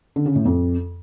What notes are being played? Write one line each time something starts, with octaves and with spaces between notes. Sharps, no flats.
D3
C#3
A2
F2